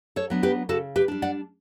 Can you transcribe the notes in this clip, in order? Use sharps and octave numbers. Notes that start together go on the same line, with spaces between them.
A4 C#5
F#3 B3 D4
G4 B4
C#3 F#4 A4
G4 B4
G3 D4
D5 F#5